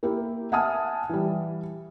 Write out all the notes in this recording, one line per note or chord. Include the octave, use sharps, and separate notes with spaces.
A#3 E4 G4 A#4
E5 F#5 G#5 A5 D#6 F6
E3 G3